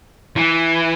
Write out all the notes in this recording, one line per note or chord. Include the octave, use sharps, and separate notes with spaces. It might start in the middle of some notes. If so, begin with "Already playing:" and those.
E3